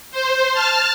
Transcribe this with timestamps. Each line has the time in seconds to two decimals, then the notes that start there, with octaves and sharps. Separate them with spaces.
0.11 C5
0.53 A5 F6